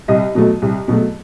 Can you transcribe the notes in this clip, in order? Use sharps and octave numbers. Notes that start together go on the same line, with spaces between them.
C2 D#5
B2 F#3 A3
C2
B2 F#3 A3